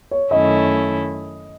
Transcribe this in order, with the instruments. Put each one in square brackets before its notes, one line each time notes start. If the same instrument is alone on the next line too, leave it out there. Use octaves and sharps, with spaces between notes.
[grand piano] C#5
[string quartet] F#2 D#3 A3 C#4 E4 [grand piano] D#5